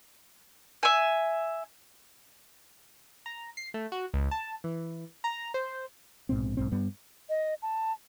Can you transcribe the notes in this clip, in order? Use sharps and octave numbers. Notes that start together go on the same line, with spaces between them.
E5 G#5
A#5
C7
A3
F#4
C#2
A5
E3
A#5
C5
A#1 G#2 B2 C4
B1 G#2 C4
G2 G3 B3
D#5
A5